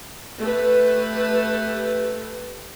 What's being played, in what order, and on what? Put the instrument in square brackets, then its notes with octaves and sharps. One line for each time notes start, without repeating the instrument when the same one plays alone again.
[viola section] A3 G4 B4